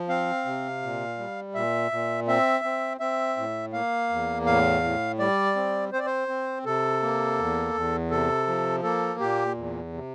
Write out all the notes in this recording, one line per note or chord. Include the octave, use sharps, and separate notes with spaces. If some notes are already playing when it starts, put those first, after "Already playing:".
Already playing: F3
C4 F5
C3
A#2
G3
A#2 E5
A#2
C4 E5
C4
C4 E5
A2
A#3 F5
E2
A2 F5
A2
G3 D5
C4
C4 C5
D5
C5
C4
C3 A4
A#3
E2
E2
C3 A4
F3
A#3 A4
A#2 G4
E2
C3